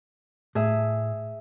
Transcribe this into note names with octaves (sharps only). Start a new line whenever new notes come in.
A2 G#4 E5